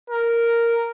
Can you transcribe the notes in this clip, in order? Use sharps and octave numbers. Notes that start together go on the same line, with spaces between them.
A#4